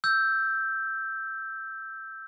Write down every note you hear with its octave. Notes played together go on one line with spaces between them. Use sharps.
E6 G6